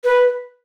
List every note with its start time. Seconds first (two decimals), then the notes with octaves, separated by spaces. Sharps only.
0.04 B4